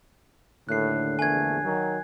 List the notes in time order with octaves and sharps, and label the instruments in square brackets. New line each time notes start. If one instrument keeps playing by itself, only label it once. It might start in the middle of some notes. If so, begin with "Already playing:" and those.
[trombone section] D#2 A2 [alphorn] D3 [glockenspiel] F#6 C7
[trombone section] A#1 E2 A3 [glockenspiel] G#5 G#6
[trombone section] D#3 F#3